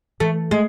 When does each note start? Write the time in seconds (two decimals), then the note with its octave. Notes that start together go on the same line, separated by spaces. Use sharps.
0.20 E3 A3
0.51 G#3 A3